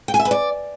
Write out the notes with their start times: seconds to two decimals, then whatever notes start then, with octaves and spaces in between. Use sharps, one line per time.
0.08 G5
0.14 G#5
0.20 E5
0.25 B4
0.31 D5